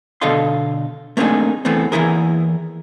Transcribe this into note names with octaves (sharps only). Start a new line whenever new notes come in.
B2 D3 A4 D#5 F5 C6
A3 A#3 C4 D4 D#4 G#4
E2 E3 A3 B3 C4
E2 E3 A#3 E4 G#4 A#4